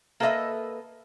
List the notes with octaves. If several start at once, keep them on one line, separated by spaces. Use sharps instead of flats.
A#3 A4 B4 C5 D#5 E5